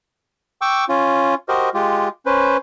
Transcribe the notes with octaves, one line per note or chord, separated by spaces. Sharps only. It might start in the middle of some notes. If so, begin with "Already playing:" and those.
G5 C#6 D6 E6
C#4 F4
F#4 G4 A#4 C5 D#5
G#3 F4 G4
C#4 B4 C5